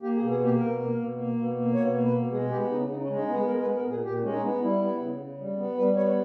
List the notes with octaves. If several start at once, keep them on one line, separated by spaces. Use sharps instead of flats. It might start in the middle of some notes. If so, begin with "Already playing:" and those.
A#3 G4
G#4
B2
G#4
A#3 G4
B2 A#4
A#3
B2
A#3
B2
A#3
B2 C#5
A#3
B4
B2
G#3 G#4
B3 G4
C#3 D#4
C#3 D#4
C#4
G#3
D#4
B3 G#4
G#3 A#4
B4
B3
A#4
A#2
G#4
A#2 G4
G#3 C#4
D#4
B3
G3 E4
B3
C#3
C#3
G3
B3
G3 B4
B3 C#5